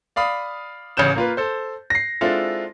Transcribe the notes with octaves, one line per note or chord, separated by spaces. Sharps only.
D5 F5 B5 D#6
A1 C#3 C#4 G6 E7
A#3 F4 B4
A4 C5
A#6 C7
G#3 C4 D4 E4 F4 A4